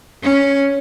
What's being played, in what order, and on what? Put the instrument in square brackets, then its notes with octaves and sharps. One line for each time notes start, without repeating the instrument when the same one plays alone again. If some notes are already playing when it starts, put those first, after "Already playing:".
[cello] C#4